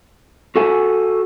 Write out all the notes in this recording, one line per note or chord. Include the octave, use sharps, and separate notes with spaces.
F#4 A4 F#5 G#5